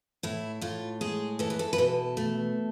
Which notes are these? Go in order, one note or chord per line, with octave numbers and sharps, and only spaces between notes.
A2 E4
A2 F4
G#3 G#4
E3 A4
B4
A4
B4
B2 A4
A3